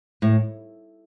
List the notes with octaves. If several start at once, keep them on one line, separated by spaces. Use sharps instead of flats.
A2